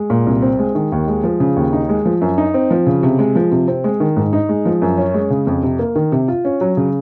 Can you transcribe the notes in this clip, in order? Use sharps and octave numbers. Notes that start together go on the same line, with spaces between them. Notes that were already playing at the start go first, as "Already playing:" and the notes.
Already playing: G#3
A#2
C2
C4
G#3
D#3
D#2
G#3
F3
C#3
D#2
D#4
G#3
F3
F#2
D#4
C4
F3
C#3
C3
G#3
F3
C3
C4
G#3
D#3
G#2
D#4
G#3
F3
F#2
C#4
G#3
C#3
F2
C3
A#3
D#3
C3
F4
C#4
F#3
C#3